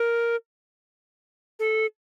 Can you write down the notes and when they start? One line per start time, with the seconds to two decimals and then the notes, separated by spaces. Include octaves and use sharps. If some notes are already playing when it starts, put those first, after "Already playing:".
Already playing: A#4
1.59 A4